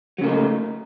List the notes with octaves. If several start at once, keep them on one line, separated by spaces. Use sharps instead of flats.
C#3 F#3 A3 A#3 D#4